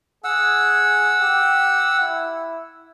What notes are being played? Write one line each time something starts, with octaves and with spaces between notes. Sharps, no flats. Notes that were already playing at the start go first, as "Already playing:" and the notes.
G#4 F#5 E6
G4
E4